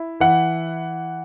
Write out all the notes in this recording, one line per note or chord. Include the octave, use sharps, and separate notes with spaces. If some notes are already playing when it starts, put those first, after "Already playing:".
Already playing: E4
E3 F#5